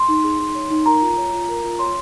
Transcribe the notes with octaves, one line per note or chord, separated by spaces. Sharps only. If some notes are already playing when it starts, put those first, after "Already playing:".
Already playing: C6
D#4
G#4
D#4
C#5
D#4
A#4 A#5
F4
C#5
F4
A#4
F4
C#5 C6